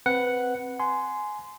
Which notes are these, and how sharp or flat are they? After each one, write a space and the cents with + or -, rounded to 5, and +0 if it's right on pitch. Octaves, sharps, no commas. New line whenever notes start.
C4 +0 B4 +0 F#5 +0
G#5 +15 C6 -15